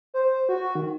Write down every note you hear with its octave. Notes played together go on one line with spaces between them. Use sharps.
C5
F#4
D#3